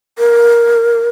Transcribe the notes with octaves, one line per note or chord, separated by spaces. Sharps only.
A#4